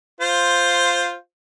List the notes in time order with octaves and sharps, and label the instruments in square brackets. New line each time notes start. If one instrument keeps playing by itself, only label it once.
[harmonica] F4 C5